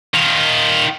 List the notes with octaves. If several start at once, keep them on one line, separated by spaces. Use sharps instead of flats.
D#3 F4